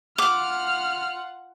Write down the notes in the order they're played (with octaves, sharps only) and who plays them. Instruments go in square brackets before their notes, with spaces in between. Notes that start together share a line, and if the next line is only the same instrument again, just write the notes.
[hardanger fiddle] F4 F#5 [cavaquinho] D6 [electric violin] F6